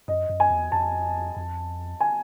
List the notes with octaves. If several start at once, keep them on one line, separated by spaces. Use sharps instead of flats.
F#2 D#5
F#2
G#5
E2
F2 A5
F2
G#5